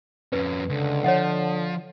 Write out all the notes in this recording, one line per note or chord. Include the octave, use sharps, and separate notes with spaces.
F2 C#4 B4
C#2 D3
F3 C#5 D#5 F#5